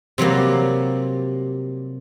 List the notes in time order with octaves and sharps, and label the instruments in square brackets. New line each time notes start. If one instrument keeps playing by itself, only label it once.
[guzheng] C3 F#3 G3 A#3